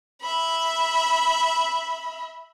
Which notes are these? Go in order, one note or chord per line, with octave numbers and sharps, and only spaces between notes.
E5 B5